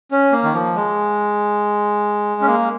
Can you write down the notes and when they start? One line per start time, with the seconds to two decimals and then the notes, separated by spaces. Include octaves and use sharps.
0.11 C#4
0.32 A#3
0.44 D#3
0.54 F3
0.76 G#3
2.41 C#4
2.47 A#3